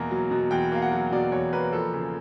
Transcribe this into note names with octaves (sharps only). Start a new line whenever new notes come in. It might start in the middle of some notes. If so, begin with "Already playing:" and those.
Already playing: E2 B2 F#3 A#3
F#3
B2
E2 G5
A#3 F5
F#5
F#3
B2 D5
E2 C#5
A#3 B4
F3 A4
C#3